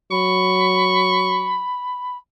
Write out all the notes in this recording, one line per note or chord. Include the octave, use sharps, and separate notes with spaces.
F#3 B5 C#6